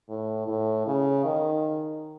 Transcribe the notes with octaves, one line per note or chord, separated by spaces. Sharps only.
A2
A2
C#3
D#3